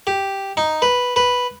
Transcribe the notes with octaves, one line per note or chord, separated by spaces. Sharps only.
G4
D#4
B4
B4